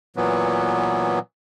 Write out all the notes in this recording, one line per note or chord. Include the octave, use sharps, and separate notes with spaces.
A#2 E3 F#3 B3